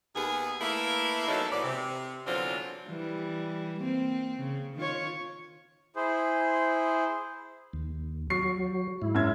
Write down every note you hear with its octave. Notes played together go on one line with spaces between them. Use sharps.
D#2 B3 G#4
A3 A#3 E4 B4 E5 F5
E2 F#3 A#3 C#4 D#4 A4
G#2 E3 B3 D5
C3
E2 D3 F#3 C4 D4 F4
E3 G3
A#3 C4
C#3
D#3 F4 C#5
E4 G#4 C5
D#2
F#3 C#6 C7
G#2 E4
F#2 E5 G#6